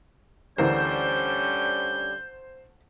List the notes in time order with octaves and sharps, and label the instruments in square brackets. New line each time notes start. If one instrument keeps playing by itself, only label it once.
[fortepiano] D2 E3 A#4 [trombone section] D3 G3 C#4 [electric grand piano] C5 [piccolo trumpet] G6